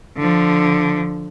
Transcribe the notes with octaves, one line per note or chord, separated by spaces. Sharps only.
D3 F3